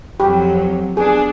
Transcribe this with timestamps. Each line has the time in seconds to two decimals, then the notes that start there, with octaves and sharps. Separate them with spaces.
0.20 F2 F#3 G4
0.97 B3 D4 G#4